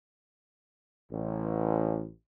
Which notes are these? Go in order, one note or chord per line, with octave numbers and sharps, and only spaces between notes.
A1